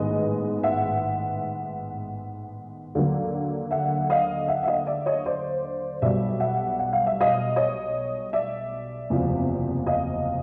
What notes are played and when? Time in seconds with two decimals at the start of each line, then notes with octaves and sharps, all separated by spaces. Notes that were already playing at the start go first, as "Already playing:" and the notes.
Already playing: A1 G#2 D#3 G#3 B3 D#5
0.63 E5 F#5
2.94 D#2 D3 F#3 A#3
3.71 E5 F#5
4.10 D#5 F5
4.48 E5 F#5
4.63 E5
4.67 D#5 F5
4.87 D5 E5
5.06 C#5 D#5
5.26 C5 D5
6.02 B1 B2 G3 D5 E5
6.40 E5 F#5
6.79 F#5
6.93 F5
7.07 E5
7.21 D#5 F5
7.56 C#5 D#5
8.33 D5 E5
9.10 F#1 E2 C3 F3
9.87 D#5 F5